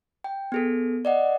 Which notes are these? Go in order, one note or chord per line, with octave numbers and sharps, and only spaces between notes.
G5
B3 G#4 A4
D5 D#5 F#5